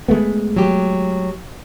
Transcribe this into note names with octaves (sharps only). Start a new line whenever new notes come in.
G#3 A3 B3
F#3 G4